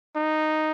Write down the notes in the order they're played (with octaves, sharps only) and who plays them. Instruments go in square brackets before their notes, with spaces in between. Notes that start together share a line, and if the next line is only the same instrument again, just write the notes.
[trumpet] D#4